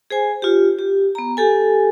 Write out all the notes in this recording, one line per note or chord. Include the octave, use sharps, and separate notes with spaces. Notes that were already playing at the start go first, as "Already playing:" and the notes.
G#4 C5 G#5
F4 G4
G4
B3 A#5
G4 A4 G#5